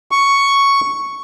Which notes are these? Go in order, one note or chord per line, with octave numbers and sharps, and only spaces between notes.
C#6